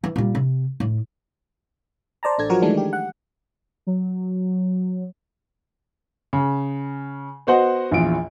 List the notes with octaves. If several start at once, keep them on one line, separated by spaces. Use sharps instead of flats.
E3
A#2 G3
C3
A2
C5 D5 A5 A#5
A1 D4 A4 G#6
F3 F#3 F#4 A#4
D#3 E3 G#3 A3 D4
G4
F#5
F#3
C#3
B3 F#4 C5 D#5 F#5
A#1 E2 F4 D7